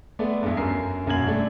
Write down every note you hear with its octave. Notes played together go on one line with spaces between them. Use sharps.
G#3 A3 B3 D5
E2 G2
F#2 A#4 C7
E1 F#2 A#2 F#4 G#6 F#7
G3 A3 D4